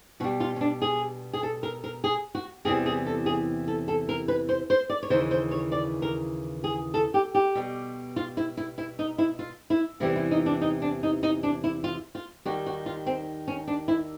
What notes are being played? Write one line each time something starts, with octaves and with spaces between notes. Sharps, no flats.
B2 G3 F#4
F4
C#4
D4
G#4
G#4
A4
A#4
A#4
G#4
F#4
E2 C3 E3 G3 G#4
G#4
A4
G#4
A4
A4
A#4
B4
C5
C5
D5
C#5
D#2 C#3 E3 C5
C5
C#5
D5
A#4
G#4
A4
G4
G4
B2 G3
F4
E4
E4
E4
D#4
E4
F4
E4
E2 C3 E3 G3 E4
E4
D#4
D4
D#4
D4
D#4
D#4
D4
E4
F4
F4
D#2 D#3 G3 F#4
F#4
F4
C4
C#4
D4
E4